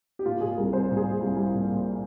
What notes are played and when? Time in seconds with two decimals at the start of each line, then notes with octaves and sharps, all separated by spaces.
0.19 G4
0.26 A#2 F4
0.41 A#2 G#4
0.56 C2 A#4
0.72 C2 C5
0.89 A#2
0.97 G#4
1.04 A#2
1.21 C2
1.36 C2
1.53 A#2
1.69 A#2